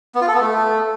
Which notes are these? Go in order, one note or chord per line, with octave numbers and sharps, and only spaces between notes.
B3
F4
A4
B3
A3